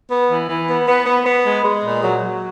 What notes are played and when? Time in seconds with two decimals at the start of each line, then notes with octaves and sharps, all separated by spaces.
0.11 B3
0.29 E3
0.49 E3
0.69 B3
0.88 B3
1.06 B3
1.26 B3
1.45 G#3
1.65 G#3
1.84 A#2
2.03 F#3
2.22 F#3